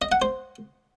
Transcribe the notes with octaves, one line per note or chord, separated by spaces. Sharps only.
D#5
F#5
C5